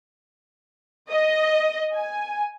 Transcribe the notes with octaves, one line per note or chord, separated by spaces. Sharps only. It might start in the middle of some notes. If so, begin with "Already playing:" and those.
D#5
G#5